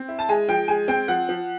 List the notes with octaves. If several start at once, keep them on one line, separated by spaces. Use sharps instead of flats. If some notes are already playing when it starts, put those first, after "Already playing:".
Already playing: C4
E4
A5
G#3 G#5
F3 G5
G#3 G#5
C4 G5
F3 F#5
F3